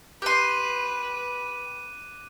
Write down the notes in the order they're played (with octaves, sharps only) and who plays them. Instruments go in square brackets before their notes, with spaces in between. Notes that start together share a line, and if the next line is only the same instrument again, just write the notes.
[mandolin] G4 C6 [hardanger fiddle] B4 [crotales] D6 F#6 D#7